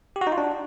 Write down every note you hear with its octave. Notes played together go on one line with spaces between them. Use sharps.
G4
F#4
D#4
F4
D4